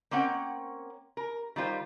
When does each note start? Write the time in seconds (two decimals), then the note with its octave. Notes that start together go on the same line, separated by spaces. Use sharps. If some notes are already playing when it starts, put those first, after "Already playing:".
0.11 A#3 C4 C#4 F#5 G5
1.17 A#4
1.56 D#3 G3 F4 C5